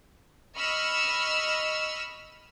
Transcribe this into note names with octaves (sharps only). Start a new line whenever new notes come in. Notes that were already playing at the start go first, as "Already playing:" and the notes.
D#5 B5 C#6 E6 F6